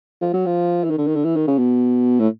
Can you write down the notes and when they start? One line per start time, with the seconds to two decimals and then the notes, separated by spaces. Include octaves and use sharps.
0.21 F3
0.33 F#3
0.46 F3
0.84 E3
0.90 D#3
0.98 D3
1.07 D#3
1.15 D3
1.24 E3
1.36 D#3
1.47 C#3
1.58 B2
2.20 A2